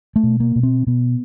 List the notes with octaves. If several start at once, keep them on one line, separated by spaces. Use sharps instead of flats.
A3
B2
A#3
B2
C4
B2 B3